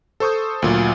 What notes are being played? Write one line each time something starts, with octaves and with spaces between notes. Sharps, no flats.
A4 C5 C#6 D#6 G6
D2 A#2 F#3